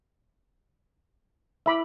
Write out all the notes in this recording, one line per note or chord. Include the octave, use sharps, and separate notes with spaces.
E4 E5 B5 D6